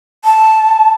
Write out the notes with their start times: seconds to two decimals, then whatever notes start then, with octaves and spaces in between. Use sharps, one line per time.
0.25 A5